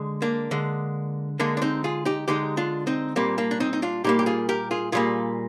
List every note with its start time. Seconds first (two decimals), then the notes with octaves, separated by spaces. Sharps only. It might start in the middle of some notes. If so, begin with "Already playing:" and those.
Already playing: D3 G#3
0.22 A#3 D4
0.51 D3 G#3
1.39 D3 G#3 A#3 D4
1.57 D4
1.62 C4 D#4
1.84 F4 G#4
2.05 D#4 G4
2.28 D3 G#3 D#4 G4
2.57 D4 F4
2.87 C4 D#4
3.16 A#2 G3 A#3 C4
3.38 A#3 D4
3.51 D4
3.60 C4 D#4
3.73 D#4
3.82 D4 F4
4.04 A#2 G3 A#3 D#4 G4
4.19 G4
4.26 F4 G#4
4.49 G4 A#4
4.71 F4 G#4
4.92 A#2 G3 A#3 F4 G#4